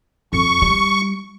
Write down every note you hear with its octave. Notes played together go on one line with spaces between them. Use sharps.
F2 C#6
G3